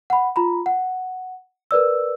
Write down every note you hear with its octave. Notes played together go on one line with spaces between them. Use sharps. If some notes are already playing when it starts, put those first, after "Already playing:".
F#5 B5
F4 A#5 B5
F#5
A#4 B4 D5 E6